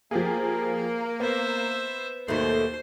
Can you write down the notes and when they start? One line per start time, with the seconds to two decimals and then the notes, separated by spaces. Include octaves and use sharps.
0.11 F3 A#3 G4 G#4
1.20 B3 C5 E5
2.28 D#2 B2 A3 C5 C6